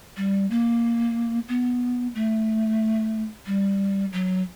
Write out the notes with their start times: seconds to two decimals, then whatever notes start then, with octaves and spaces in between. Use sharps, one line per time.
0.17 G3
0.51 A#3
1.48 B3
2.15 A3
3.46 G3
4.13 F#3